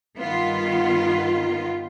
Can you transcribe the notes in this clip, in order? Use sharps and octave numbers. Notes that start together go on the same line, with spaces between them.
G2 D#3 B3 F4